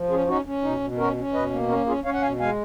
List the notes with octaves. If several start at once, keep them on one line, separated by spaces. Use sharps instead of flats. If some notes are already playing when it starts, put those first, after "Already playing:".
Already playing: F3
C#4 F4 G#4
C#4 D#4 F#4
C#4
B2 D#4
B2
C#4 F#4 A#4
C#4
B2 B4 D#5
A#3
C#4 F#4 A#4
C#4 F4 G#4
C#4 C#5 F5
F#5
B2 F5 G#5
G#3 F5 G#5